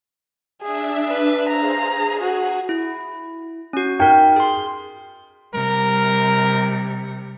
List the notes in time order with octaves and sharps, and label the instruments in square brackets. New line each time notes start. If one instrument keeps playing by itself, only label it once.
[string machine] D4 E5 [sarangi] G#4
[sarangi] B4
[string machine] G#4 C5 F5 [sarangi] A#5
[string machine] G#4
[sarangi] F#4
[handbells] E4
C#4 F#4
[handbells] D#4 A#4 [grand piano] G5
[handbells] G#4 C6
[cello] C3 G3 [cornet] A#4